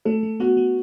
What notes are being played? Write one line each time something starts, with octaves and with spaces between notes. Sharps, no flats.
A3 A4
A3
B3 F#4
B3